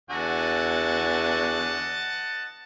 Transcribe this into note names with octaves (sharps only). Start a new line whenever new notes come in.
E2 D3 F#4 D#5 F#5 G#5 A5